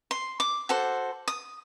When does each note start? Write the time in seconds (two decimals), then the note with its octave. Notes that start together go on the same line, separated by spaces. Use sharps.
0.11 C6
0.40 D6
0.69 F#4 A4 C5
1.28 D#6